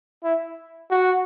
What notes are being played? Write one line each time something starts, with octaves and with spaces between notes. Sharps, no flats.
E4
F#4